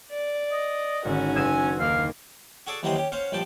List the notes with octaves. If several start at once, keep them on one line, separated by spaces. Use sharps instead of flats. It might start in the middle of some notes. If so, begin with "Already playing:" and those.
D5
D#5
G#1 D3 C#4 F#4
F#1 G#5 E6 E7
D#2 A#3 F5 D6
F#4 G#4 A4 D5
D#2 E3 F#3 G3 C5 D#5
C#4 G4
C#4 C5 F5 F#5
A#1 G2 F3 G5 A5